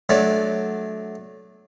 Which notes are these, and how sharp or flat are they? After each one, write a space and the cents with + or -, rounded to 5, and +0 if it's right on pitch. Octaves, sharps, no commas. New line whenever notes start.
F#3 +0 A3 -20 D4 +0